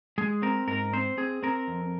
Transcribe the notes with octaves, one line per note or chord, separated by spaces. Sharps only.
G#3 G#4
C4 A#4
G#2 A#4
C4 C5
C4 G#4
C4 A#4
F2